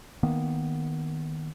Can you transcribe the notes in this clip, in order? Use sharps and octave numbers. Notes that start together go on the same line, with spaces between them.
D#3 A#3 B3